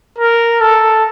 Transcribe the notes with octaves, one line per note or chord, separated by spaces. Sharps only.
A#4
A4